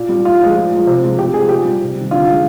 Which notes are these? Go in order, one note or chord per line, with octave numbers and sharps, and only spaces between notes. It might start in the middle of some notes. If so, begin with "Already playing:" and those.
Already playing: A#2
G3
A#2 F4
F3 G#3
A#2
F3 G#3
C3
F3 G#3
C3 G4
F3 G#3 G#4
A#2 G4
G3
C3
D#3 G3
D3 F4
F3 G#3